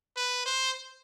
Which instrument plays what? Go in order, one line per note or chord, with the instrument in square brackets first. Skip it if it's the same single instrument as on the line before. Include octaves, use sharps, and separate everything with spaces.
[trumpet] B4
C5